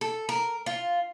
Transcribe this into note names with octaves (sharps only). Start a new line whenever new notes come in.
A4
A#4
F4